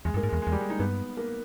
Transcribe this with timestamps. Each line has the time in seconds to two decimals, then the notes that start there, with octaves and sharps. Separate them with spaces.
0.05 E2 G#3
0.14 G2 A#3
0.23 G#2
0.29 E2 G#3
0.42 G#3
0.47 E2
0.52 G3
0.61 G#3
0.70 D#4
0.79 G2 B3
1.17 A#3